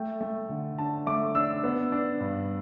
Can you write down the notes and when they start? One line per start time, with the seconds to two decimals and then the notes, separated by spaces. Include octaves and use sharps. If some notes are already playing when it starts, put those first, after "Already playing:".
Already playing: A3 G5
0.21 A3
0.49 D3
0.78 D4 A5
1.06 A3 D6
1.35 D4 E6
1.64 B3
1.92 D4
2.20 G2